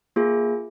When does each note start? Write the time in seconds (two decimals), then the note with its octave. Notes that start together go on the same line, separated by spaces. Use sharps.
0.16 A#3 F4 G#4